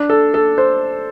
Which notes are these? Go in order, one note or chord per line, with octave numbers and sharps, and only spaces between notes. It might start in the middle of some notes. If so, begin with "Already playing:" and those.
Already playing: D4
A4
A4
C5